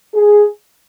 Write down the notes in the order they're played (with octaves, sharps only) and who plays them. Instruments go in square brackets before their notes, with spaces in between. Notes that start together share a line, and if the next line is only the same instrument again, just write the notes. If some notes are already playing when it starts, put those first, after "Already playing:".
[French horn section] G#4